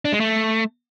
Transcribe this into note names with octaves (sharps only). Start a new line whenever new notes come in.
D4
G#3
A3